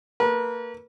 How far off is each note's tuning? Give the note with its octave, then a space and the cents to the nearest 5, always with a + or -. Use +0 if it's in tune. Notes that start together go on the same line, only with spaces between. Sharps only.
A#3 -30 B4 -35